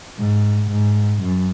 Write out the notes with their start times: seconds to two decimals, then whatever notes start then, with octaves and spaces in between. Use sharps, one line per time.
0.18 G#2
0.70 G#2
1.22 F#2